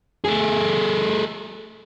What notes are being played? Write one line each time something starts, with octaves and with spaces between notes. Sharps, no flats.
A3 G#4